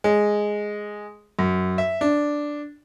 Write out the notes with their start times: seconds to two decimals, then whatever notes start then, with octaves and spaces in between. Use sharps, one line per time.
0.04 G#3
1.39 F#2
1.78 E5
2.01 D4